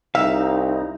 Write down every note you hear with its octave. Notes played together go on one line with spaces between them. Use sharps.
C2 D#4 E5 F5